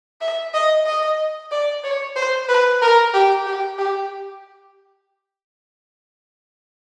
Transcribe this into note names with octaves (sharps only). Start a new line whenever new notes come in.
E5
D#5
D#5
D5
C#5
C5
B4
A#4
G4
G4
G4